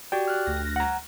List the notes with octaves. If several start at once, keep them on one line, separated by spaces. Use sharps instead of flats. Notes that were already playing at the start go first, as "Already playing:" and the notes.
F#4 G4 D5 G5
F6 F#6
D2 A#6
F#5 A#5